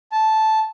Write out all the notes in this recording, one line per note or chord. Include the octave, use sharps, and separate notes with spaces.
A5